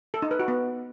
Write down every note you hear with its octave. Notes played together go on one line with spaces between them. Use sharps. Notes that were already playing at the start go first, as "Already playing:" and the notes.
A4
D#4
B4
F#4
B3